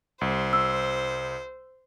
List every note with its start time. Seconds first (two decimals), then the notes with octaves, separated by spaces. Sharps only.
0.21 C2 C5
0.53 E6